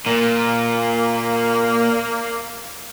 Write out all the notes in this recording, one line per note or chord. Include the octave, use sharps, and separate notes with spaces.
A#2 A#3